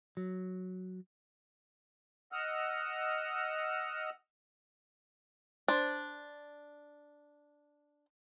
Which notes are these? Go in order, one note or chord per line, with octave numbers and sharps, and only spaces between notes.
F#3
D#5 F#5 E6 F6
D4 C5